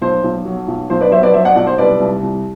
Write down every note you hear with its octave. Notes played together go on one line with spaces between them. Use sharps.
B1 C5
B1
F#3
B1
B1 C5
B4 D5
F#3 C5 E5
B4 D5
F#3 C5 E5
D5 F#5
B1 D5 F#5
C5
C2 B4 D5
C2
C2